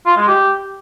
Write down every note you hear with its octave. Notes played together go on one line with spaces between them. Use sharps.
F4
G#3
G4